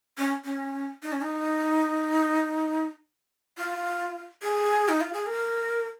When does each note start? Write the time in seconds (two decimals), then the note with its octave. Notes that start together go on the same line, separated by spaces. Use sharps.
0.18 C#4
0.45 C#4
1.03 D#4
1.12 C#4
1.21 D#4
3.58 F4
4.42 G#4
4.89 D#4
5.01 F4
5.13 G#4
5.26 A#4